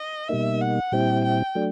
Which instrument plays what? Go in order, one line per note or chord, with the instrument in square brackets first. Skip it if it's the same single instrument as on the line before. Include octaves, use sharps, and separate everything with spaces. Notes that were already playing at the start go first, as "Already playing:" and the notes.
Already playing: [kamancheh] D#5
[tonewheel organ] B2 G3 A#3 D#4 [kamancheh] E5
[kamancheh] F#5
[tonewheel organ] A#2 G3 C4 E4 [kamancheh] G5
[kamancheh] G5
[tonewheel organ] F#3 A3 D4